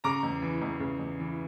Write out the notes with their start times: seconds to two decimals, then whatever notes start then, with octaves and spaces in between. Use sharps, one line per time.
0.04 C#3 A#5 D6
0.23 E2
0.42 E3
0.62 E2
0.80 C#3
1.00 E2
1.20 E3